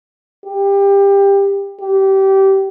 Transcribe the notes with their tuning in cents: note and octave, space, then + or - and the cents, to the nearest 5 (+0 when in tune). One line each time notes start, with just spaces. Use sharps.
G4 +20
G4 -20